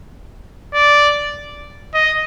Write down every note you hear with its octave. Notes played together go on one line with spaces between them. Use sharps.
D5
D#5